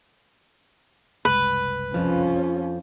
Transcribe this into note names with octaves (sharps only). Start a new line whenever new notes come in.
F#1 C2 G#3 B4
F2 F3 C#4 F4